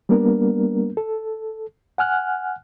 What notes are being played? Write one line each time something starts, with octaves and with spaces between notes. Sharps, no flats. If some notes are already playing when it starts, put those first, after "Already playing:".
G3 A#3 B3 D4 A#4
A4
F#5 G#5 F6 F#6